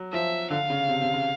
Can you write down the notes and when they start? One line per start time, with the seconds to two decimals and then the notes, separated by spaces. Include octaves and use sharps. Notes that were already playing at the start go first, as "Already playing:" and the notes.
Already playing: F#3
0.12 F3 E5
0.50 D3 F5
0.70 C#3
0.89 C3
1.01 C3
1.13 C#3